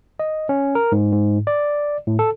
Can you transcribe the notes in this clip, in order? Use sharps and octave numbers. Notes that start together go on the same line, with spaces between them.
D#5
C#4
A#4
G#2
G#2
D5
A2
A4